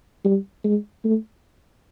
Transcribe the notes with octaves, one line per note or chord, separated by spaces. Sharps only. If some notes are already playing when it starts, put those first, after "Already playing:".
G3
G#3
A3